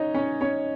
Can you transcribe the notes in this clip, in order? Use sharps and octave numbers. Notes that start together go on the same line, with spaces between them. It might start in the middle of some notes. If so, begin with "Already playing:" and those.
Already playing: C#4 D#4 C#5 D#5
C#4 C#5
C#4 C#5